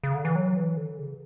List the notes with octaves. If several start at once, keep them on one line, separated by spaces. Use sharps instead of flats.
C#3
D3
E3
F#3
E3
D3
C#3